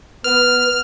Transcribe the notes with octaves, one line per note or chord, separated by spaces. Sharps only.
B3 B4 F6